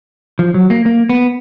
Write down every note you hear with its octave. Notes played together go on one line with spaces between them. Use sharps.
F3
F#3
A#3
A#3
B3